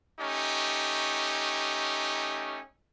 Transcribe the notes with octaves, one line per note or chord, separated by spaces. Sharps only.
A3 C#4 D#4 G4